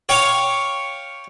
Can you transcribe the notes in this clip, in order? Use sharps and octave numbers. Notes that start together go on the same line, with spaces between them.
C#5 F5 G5 C#6 D6